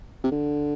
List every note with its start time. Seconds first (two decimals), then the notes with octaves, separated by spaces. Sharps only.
0.24 C3
0.32 D3